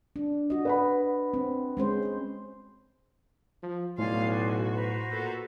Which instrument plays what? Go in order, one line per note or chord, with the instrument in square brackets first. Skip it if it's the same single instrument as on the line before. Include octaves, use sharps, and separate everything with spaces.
[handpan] D4
F#4 D#5
[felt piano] B4 F#5 B5
[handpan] C4
G#3 C#4 C5
[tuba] F3
[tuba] B1 [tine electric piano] A2 [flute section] D5 G#5 C6 [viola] F5
[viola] F#4
[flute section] B4 C5 A#5
[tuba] A#2 [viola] F#4 A4